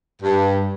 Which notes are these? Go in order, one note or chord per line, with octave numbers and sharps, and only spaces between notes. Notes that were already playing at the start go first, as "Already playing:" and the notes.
G2